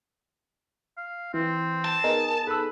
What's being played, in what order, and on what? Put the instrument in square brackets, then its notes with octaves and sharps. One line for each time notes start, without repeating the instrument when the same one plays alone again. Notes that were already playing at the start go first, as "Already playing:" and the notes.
[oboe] F5
[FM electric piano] E3 [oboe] C4
[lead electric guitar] A5
[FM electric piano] B3 D#4 G#4 [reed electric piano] A#4
[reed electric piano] A4 E6 [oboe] B4